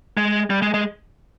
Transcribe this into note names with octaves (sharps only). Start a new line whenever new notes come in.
G#3
G3
G#3
G#3